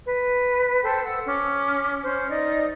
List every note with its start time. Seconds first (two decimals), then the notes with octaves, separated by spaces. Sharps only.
0.05 B4
0.83 A4 C5 G5 A5
1.03 F#5 E6
1.26 C#4 D6
2.04 C#4 C5
2.30 D#4 D5